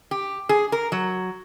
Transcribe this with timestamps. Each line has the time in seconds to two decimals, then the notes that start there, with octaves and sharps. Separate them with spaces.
0.11 G4
0.49 G#4
0.72 A#4
0.92 F#3